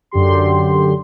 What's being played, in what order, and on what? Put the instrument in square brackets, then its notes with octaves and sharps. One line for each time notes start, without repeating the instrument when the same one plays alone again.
[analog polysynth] F#2 D3 G4 C6